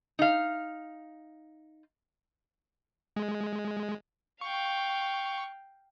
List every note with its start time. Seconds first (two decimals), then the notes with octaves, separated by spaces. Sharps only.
0.19 D#4 F5
3.16 G#3
4.41 F5 G5 C#6